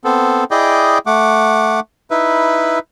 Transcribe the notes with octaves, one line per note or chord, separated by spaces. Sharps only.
B3 C4 A4
E4 G#4 D5 D#5 G5
A3 F#5 D6
D#4 E4 B4 E5